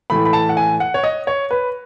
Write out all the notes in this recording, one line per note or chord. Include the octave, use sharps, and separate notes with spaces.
A2 E3 A3 B5
B5
A5
F#5
G#5
F#5
C#5
D#5
C#5
B4